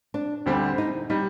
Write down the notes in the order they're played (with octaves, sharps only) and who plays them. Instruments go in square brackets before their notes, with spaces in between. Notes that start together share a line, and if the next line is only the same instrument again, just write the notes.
[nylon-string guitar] D4
[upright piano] D2 D3 G3 C4 G4
[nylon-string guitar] D#4
[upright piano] G3 [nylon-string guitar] D#4